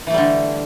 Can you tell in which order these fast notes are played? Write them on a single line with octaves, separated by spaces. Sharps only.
E3 A3 G3 D3